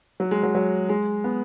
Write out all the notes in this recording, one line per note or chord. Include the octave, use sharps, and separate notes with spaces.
F#3
G#3
F#3
F#3
G#3
B3